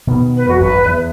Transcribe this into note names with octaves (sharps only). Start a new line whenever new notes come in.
B2 D#3 B3
B4
F2 E3 F#4
G#1 F#2 F#3 B4
E2